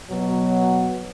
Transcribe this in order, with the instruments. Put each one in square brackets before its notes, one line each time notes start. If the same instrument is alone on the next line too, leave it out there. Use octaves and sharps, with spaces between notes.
[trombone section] B2 F#3